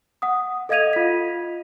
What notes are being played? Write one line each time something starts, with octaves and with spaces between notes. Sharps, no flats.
F#5 D#6
A4 D#5 F5 G#6 D#7 F7
F4 B6